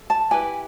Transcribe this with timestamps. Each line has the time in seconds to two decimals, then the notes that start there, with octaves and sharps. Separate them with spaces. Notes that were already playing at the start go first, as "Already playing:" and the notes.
Already playing: A4
0.10 A5
0.31 E4 G4 B4 G#5